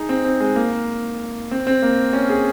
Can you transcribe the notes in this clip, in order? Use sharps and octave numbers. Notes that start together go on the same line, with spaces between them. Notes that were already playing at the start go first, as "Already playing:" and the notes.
Already playing: D#4 G#4
C4
C4
G#3
A#3
C4
C4
A#3
C#4
G#4